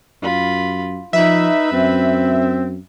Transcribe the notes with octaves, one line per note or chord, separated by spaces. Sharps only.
F#2 F4 B5
F3 D#4 B4 E5 B5
F#2 C4